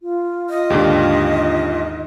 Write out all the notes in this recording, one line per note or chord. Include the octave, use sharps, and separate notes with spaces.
F4
D#5
D#2 G#2 D3 G4